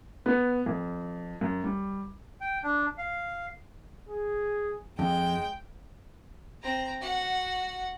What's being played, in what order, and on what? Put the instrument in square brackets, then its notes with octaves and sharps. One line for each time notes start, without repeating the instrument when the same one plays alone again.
[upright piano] B3
F2
F#2
G3
[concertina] G5
D4
F5
[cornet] G#4
[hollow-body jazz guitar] F2 [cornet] G#3 [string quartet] G5
[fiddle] C4 A#5
F#4 F#5